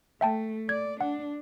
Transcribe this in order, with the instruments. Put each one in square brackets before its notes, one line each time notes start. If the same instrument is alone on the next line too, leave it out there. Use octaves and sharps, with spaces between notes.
[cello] A3 [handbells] E5 G5 A5
[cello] D5 [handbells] G#6
[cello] D4 [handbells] F#5